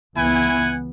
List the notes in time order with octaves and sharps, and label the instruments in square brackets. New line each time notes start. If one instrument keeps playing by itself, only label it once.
[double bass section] C#2 E3 B3 [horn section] E4 F#5 G#5